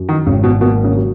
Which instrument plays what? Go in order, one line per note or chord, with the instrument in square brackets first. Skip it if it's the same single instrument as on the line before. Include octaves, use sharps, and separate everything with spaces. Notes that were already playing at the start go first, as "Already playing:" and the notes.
Already playing: [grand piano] F#2
[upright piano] D#3
[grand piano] G#1 [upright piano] C#3
[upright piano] B2
[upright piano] B2 [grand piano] A#3
[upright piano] C#3
[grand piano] F#3